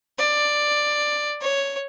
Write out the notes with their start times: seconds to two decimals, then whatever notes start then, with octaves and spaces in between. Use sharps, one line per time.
0.19 D5
1.41 C#5